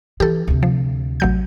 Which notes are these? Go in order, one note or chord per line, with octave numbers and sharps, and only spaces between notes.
E3 G4 A4
D2 C3
F3
A1 F#3 G6